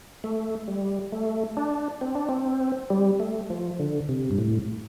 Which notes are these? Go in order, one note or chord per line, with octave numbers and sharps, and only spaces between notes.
A3
G3
A3
D4
C4
D4
C4
G3
A3
F3
D3
C3
G2
A2